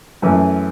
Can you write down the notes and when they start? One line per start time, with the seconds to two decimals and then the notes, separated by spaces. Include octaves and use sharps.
0.22 F#2 E3 A3 C#4